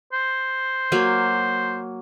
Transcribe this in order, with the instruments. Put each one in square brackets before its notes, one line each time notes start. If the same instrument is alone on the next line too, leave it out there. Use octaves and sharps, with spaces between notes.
[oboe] C5
[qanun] F#3 A#3